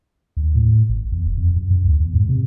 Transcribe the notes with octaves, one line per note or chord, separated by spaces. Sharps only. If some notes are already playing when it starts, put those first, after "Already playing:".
D#2
A2
G#1
E2
E1
F2
F#2
F#2
D2
E2
G#2
C3